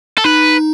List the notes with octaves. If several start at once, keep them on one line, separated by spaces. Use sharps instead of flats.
A4
D#4 B4